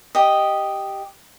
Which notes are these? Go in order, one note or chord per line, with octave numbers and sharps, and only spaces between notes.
G4 D#5